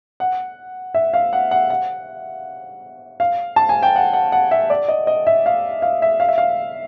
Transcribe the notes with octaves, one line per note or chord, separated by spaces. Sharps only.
F#5
E5
F5
F#5
F#5
F#5
F5
A5
G#5
G5
F#5
F#5
F#5
E5
D5
D#5
D#5
E5
F5
F5
E5
F5
E5
F5